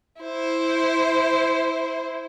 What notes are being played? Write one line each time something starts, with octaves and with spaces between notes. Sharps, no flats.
E4 C5